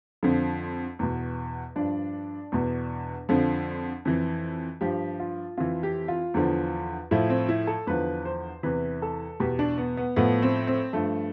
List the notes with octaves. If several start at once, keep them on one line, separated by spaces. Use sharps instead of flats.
F2 D3 F3
E2 B2
G2 F3 D4
E2 B2
F2 D3 F3
F2 E3
G2 F3 G4
F4
F2 E3 F4
G4
F4
E2 D3 F3
A2 F3 E4
C4
E4
A4
E2 D3 F3 B4
C5
E2 C3 E3 B4
A4
E2 B2 G4
D4
B3
B3
A2 F3 B3
C4
C4
G2 F3 A3